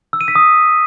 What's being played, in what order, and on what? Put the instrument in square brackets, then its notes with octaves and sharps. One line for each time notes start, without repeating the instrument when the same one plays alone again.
[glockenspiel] E6
D#7
B6
D#6